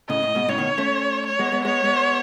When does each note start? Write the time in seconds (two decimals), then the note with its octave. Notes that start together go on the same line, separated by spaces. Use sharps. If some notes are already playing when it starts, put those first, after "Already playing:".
0.09 A2 C#3 D#5
0.23 A2
0.35 G#2 B2
0.48 A2 C#3 C#5
0.58 B2 D#3
0.78 A3 C#4
1.26 C#5
1.39 G#3 B3
1.52 G#3 B3
1.65 G#3 B3 C#5
1.84 G#3 B3